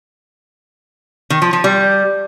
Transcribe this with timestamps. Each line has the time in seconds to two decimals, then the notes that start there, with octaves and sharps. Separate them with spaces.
1.30 D#3
1.42 F3
1.53 F3
1.64 G3